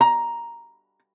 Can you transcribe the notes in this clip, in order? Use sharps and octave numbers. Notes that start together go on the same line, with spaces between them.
A#5